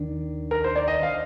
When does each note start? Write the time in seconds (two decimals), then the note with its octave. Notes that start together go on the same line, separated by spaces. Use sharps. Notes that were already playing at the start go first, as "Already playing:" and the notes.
Already playing: D#2 D#3 D4
0.51 A#4
0.64 C5
0.76 D5
0.88 D#5
1.03 F5